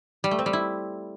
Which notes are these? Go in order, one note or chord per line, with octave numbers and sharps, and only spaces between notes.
G3
A3
C4
G3
E4